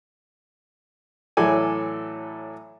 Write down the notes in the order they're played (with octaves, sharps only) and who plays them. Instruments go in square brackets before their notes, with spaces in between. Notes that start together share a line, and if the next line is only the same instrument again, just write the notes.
[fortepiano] A2 E3 F#3 A4 D5 G#5